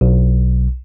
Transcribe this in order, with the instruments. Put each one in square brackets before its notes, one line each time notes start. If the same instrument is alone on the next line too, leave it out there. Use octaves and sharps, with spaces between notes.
[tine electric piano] B1